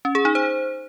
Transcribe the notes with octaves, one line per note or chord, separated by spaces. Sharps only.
C#4
G#4
D#4
C5